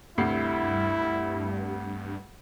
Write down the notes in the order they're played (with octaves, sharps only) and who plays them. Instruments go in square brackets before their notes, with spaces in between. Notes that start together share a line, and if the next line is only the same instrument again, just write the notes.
[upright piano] D2 C3 C7 [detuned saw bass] G2 [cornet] E4